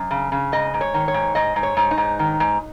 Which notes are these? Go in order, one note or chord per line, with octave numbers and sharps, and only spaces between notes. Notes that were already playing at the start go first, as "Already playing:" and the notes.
Already playing: F#2
C#3
C#3
G#2 D#5
G#2
C#5
D#3
C#5
G#2
G#2 D#5
G#2
C#5
G#2
D#4
G#2
D#3
G#2